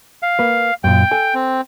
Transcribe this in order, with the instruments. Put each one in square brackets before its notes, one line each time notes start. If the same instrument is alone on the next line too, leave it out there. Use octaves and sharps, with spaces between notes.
[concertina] F5
[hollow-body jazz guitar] A#3 B4
[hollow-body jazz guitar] F#2 A#2 [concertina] G5
[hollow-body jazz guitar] A4 G#5
[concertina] C4